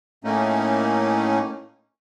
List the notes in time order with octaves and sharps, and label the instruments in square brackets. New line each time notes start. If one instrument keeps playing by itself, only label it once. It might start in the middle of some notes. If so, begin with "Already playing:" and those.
[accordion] A2 A3 A#3 C#4 D#4